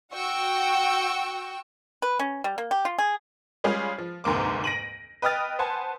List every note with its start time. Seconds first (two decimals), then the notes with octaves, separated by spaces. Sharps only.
0.14 F#4 F#5 G5 C#6 E6
2.02 B4
2.19 C#4
2.44 G3
2.58 A#3
2.71 G4
2.85 F4
2.99 G#4
3.64 G3 G#3 C#4 F4 G#4
3.98 F3
4.24 F1 D2 G#2 A#3 D6
4.64 A#6 D7 D#7 F#7
5.22 B4 D#5 G5 D#6 F6 A6
5.59 B4 C5 F#5 G#5 A5